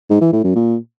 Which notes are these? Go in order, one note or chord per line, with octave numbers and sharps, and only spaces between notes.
G#2
E3
A2
F#2
A#2